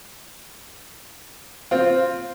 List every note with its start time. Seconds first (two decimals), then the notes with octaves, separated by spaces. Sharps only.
1.71 C4 F4